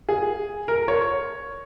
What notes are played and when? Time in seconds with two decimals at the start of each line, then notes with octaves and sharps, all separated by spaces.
0.09 G#4
0.68 A#4
0.88 C#5